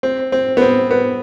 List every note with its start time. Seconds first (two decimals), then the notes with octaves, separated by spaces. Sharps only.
0.03 C4
0.32 C4
0.57 B3
0.61 C4
0.91 B3